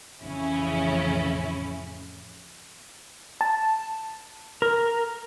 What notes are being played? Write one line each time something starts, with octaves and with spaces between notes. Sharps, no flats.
A1 F2 C#3 C#4 E4
A5
A#4